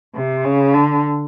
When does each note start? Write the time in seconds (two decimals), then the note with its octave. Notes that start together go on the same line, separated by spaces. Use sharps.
0.15 C3
0.44 C#3
0.74 D3